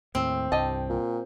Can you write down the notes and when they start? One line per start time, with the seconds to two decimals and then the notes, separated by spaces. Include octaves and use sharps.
0.15 D#2 A2 C4
0.52 C2 G2 G4 D#5 A5
0.90 A#2